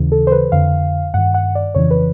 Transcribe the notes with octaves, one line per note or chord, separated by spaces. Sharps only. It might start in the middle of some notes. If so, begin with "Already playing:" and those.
Already playing: D#2 C#3 E3
A4
C5
B4
F2 D3 F5
G2 D#3 F#5
F#5
D5
F2 C#3 E3 C#5
B4